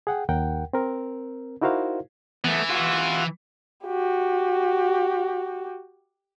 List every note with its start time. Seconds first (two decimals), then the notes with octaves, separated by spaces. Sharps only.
0.07 G#4 F#5 G5
0.29 D#2 A#4 F#5 G5
0.73 C4 A#4
1.61 D#4 E4 F#4 A#4 C5 F5
2.44 E3 A3 B3
2.70 F4 F#4
3.86 F#4 G4